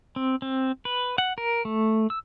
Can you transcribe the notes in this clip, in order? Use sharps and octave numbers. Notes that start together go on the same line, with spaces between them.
C4
C4
B4
F#5
A#4
A3
E6